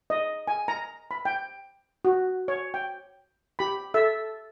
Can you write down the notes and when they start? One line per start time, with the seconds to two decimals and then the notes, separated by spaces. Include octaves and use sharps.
0.10 D#5
0.47 G#5
0.68 A#5
1.11 B5
1.25 G5
2.05 F#4
2.48 C#5
2.74 G5
3.59 G4 B5
3.94 A4 E5